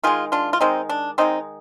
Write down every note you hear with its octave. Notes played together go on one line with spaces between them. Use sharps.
D#3 G#3 F4 G#4
D4 F4
F4
D#3 G#3 C4 D#4
D4
D#3 G#3 C4 D#4